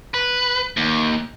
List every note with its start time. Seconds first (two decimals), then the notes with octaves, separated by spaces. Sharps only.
0.14 B4
0.77 D#2